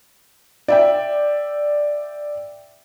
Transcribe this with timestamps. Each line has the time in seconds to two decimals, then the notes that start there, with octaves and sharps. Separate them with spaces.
0.68 D5 E5 G5